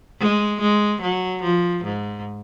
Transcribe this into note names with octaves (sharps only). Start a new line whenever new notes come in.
G#3
G#3
F#3
F3
G#2